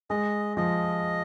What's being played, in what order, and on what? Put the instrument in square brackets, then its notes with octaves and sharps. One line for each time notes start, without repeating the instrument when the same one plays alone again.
[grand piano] G#3 [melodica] D#5
[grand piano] F3 [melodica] D#5